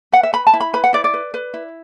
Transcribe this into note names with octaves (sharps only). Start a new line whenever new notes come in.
B4 F#5
E5
B4 B5
A5
E4
B5
B4 B5
F#5
E4 D5
D5
B4
B4
E4